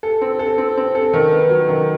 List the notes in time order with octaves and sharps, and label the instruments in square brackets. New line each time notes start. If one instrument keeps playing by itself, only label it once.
[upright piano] A4
C4
A4
C4
C4
A4
D#3
B3
F#3
D#3